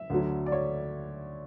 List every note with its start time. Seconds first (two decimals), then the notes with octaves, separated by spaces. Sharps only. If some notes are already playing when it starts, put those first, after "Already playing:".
Already playing: E5
0.10 D2 D3 F#3
0.46 D5
0.52 C#5